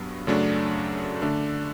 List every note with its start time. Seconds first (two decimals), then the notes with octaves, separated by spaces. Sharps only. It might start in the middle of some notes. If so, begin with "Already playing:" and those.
Already playing: G2 F#3 B3
0.27 F#2 C#3 F#3 A3 D4
1.22 D3 A3 D4